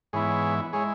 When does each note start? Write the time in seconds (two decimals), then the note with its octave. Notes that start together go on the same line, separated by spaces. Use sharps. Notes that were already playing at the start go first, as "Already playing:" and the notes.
0.13 G#2 E3 B3 E4 G#4 C#5
0.73 G#3 E4 G#4 C#5